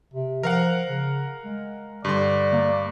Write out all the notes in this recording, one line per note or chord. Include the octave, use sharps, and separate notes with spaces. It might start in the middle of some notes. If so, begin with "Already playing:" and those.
C3
F3 A#4 F5 F#5
C#3
G#3
G2 D3 D5 C6
A#3